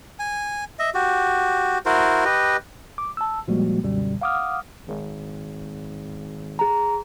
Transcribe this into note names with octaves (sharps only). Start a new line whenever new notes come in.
G#5
D#5 E5
F#4 G4
E4 F#4 A#4 C5
G4 B4 D#5
D6
A5 E6
A#2 F3 G3 G#3 A#3 F#4
C#2 F#2 B2 D3 G3
F5 F#5 D6 D#6 F6
G#1
G#4 A#5